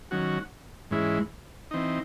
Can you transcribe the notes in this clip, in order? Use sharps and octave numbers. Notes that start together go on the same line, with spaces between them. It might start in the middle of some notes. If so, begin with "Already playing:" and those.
D#3 F#3 C#4 F#4
G#2 E3 G#3 C#4 E4
E3 C4 D#4